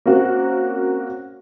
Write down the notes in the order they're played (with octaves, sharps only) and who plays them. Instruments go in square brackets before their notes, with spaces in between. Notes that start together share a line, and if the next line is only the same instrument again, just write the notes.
[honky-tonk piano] A#3 C4 C#4 F#4